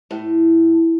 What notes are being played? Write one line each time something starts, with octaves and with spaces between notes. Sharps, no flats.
A2